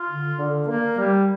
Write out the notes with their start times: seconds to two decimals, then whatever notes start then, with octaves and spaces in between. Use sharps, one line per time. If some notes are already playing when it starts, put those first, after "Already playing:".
Already playing: F4
0.10 D3
0.38 D3
0.67 A#3
0.98 G3